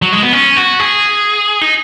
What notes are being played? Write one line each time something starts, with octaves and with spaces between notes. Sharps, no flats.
F#3
G#3
B3
C#4
F#4
G#4
D#4